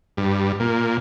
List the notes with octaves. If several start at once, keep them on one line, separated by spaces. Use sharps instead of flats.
G2
A#2